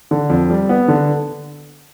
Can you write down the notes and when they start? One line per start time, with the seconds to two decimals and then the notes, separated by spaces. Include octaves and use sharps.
0.11 D3
0.30 F2
0.50 G3
0.69 B3
0.88 D3